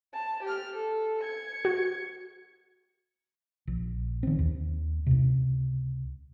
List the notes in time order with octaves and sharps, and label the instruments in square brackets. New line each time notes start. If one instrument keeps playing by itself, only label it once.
[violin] A5
G4 F6
A4
G#6 C#7
[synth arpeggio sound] F#4
[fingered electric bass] A#1
D#3 C4
D#2
C#2 C3